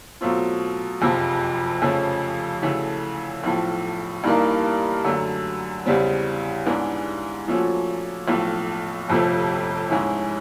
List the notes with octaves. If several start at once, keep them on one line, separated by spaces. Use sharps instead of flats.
B2 F#3 A3 C4 F4
F#1 F2 C3 F3
F2 C#3 F3 A3 C#4
D2 C#3 E3 A3
B1 A2 F3
G2 E3 G3 A#3 D#4
F#2 D3 F#3 A3
E2 C#3 E3 G3 C4
G#2 E3 G#3 B3 D4
A#2 F3 A3 C#4 F#4
B1 A2 F3 A3
G1 F2 C3 F3 A3
G#2 E3 G#3 C#4 E4